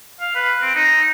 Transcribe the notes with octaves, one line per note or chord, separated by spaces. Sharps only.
F5
B4
C4
D#4